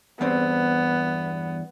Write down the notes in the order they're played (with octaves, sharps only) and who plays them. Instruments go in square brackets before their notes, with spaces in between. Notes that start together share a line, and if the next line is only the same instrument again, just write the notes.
[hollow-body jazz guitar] E2 G2 C4 [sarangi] B3